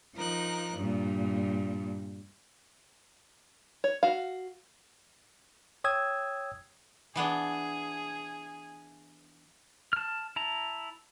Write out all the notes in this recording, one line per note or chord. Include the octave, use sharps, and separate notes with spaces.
F3 D#4 A#4 F#6
G2 A#2
C#5
F#4 F5
C#5 G5 D#6 E6 G#6
E3 B3 D4 G#4
A5 F6
E4 A5 A#5